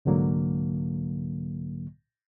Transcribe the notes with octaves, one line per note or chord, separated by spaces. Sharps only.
C2 G#2 D3 F#3 A#3